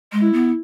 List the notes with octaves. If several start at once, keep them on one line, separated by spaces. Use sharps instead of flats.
G#3
E4
B3